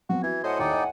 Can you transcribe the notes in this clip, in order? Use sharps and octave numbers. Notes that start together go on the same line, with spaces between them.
F#3 B3 C4 F#4
E3 F#4 G#6
A2 C5 D#5 F#5 G#5 C6
D#2 D#4 D5 G5
D#5